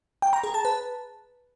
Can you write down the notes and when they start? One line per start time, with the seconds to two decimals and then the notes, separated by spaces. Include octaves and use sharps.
0.22 G5
0.33 A#5
0.44 G#4
0.54 A5
0.65 B4